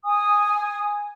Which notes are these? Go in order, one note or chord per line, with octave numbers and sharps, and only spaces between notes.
G#5 D#6